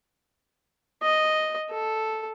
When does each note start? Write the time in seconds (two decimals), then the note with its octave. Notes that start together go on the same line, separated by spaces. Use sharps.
1.03 D#5
1.71 A4